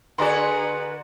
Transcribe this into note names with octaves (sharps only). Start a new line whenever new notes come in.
D3 F#4 G#4 B4 D5 A#5 C6